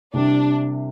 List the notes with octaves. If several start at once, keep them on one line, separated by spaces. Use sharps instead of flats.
C2 C3 G3 D4